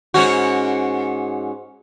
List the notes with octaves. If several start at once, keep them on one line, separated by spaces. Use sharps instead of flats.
G#2 C#4 F#4